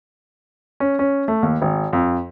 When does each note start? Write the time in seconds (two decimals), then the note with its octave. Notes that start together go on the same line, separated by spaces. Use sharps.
0.80 C#4
0.99 C#4
1.28 A3
1.43 D#2
1.62 G#1
1.93 F2